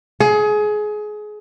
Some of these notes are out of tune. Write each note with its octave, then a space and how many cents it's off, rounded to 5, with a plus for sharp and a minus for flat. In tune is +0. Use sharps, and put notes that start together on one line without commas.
G#4 +25